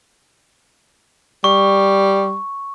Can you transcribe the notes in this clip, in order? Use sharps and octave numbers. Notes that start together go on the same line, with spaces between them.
G3 C#6